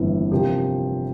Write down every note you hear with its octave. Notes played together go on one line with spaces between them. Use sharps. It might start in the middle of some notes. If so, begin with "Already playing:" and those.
Already playing: G1 F2 E3 A#3 E4
C3 F3 C4 G4 A#4